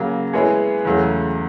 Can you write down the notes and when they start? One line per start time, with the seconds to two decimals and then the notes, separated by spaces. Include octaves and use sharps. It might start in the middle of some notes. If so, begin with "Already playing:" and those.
Already playing: C#3 F#3 A#3
0.33 G#3 B3 E4 G#4 C#5
0.85 E2 C#3 F#3 A3